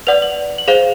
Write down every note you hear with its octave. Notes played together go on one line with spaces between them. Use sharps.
B4 D5 F#5 F7
F#7
F#7
G#4 C5 F5 F7